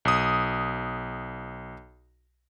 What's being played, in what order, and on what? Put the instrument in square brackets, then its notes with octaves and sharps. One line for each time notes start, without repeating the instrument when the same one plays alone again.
[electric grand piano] B1 D#6